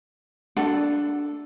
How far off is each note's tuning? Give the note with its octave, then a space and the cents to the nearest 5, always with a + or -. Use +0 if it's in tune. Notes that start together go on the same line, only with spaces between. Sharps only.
D4 -5 A4 +0 F#5 +0